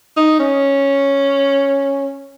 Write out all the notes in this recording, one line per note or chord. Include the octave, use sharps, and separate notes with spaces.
D#4
C#4